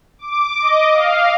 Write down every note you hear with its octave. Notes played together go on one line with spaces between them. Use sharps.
D6
D#5
F5